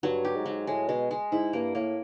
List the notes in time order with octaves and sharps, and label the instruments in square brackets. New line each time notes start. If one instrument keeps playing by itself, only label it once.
[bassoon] G2 [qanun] F#3
[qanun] G4
[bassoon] G#2
[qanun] F#3
[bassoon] A2 [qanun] G#3
[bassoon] B2 [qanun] G#3
[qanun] G#3
[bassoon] G#2 [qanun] E4
[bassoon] G2 [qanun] A#3
[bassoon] A2 [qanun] A#3